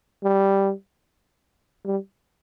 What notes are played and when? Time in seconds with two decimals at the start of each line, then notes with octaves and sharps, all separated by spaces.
0.24 G3
1.85 G3